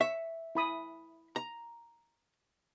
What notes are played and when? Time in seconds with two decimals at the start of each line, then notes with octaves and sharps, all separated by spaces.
0.01 E5 C#6
0.55 E4 B5 D#6
1.36 A#5